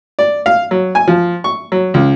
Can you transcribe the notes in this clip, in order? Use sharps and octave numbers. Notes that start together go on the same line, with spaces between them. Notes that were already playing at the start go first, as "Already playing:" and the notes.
D5
F5
F#3
G#5
F3
C#6
F#3
C#2